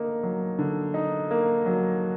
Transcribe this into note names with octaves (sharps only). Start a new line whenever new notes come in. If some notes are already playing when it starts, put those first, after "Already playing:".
Already playing: D3 A#3 D#4
F#3
D3
D#4
A#3
F#3